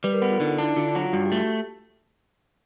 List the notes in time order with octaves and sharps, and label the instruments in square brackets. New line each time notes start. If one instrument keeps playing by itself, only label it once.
[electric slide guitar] G3 [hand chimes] B4
[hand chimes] A#4
[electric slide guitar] B3 [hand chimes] A4
[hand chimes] F4
[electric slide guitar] D3 [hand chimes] D#4
[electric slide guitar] D4 [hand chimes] E4
[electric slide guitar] D3 [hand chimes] F4
[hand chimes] F4
[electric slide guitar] F#3
[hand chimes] F4
[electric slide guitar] G2 [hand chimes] F#4
[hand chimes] G4
[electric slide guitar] A3